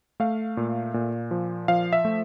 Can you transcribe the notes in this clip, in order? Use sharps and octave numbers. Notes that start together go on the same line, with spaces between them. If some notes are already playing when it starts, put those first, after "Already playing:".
A3 F5
A#2
A#2
F3
F3 F5
E5
A3